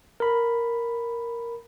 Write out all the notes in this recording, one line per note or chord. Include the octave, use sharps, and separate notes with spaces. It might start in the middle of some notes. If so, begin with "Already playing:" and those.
A#4 B5